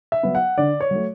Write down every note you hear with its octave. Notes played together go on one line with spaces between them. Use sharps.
E5
F#3 B3
F#5
D3 D5
C#5
F#3 A3